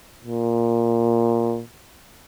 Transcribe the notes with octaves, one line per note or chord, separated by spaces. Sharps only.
A#2